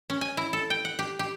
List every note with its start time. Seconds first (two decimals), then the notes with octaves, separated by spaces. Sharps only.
0.10 C#4
0.21 G#5
0.37 E4
0.53 A4
0.70 G5
0.85 F#5
0.99 G4
1.19 G4